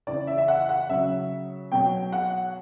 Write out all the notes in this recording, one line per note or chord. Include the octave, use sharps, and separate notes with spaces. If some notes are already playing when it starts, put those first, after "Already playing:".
C#3 E3 D5
E5
E5
F#5
F#5
C#3 F#3 E5
B2 F#3 G5
F#5